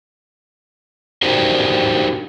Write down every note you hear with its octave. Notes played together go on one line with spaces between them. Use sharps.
D4 D#4 F#4 G4 A#4 C5